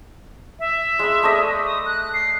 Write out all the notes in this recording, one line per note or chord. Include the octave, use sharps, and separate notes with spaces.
E5
G#3 B5
A3 D5 D#5
D#6
F#6
C7